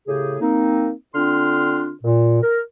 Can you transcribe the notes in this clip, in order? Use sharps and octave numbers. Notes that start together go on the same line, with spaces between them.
A2 C#3 G4 G#4
A#3 C4 D#4
D3 C4 D4 F4 C6 F6
A#2
A#4